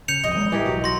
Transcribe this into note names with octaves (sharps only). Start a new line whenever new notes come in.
C#3 G6 C#7 F7
E1 C2 F2 D#5
E3 G3 G#3
A1 E3 G4 A#4
B1 F#3
F#3 C6 A#6